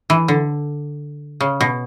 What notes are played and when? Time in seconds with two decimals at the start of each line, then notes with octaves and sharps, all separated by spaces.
0.10 E3
0.28 D3
1.41 C#3
1.61 B2